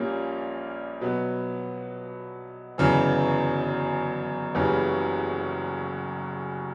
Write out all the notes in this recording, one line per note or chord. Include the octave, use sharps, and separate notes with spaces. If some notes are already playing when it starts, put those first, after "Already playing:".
Already playing: A#1 A#2 G3 A#3 C#4
B2 F#3 B3
G1 F#2 C#3 E3
F#1 F#2 C#3 E3 G3